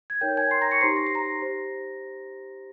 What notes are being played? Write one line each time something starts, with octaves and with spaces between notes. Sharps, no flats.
G#6
D#4 A#4 C#5 G5 G6
G#5 G#6
C6 C7
A#5 A#6
C#6 C#7
D#4 G4 C5 C6 C7
A#6
C7
A#5 A#6
G4 C5